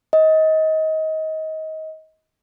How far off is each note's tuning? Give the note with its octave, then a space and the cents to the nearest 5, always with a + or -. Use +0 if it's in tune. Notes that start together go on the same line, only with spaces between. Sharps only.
D#5 +25